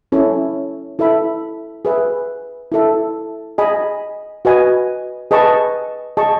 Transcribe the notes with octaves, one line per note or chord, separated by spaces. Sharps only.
C#4 E4 A4 C#5
E4 A4 E5 B5
G#4 B4 E5
E4 A4 E5
G#4 D#5 G#5 B5
F#4 B4 D#5 G#5
G#4 B4 D#5 A5 C#6
G#4 D#5 A5 C#6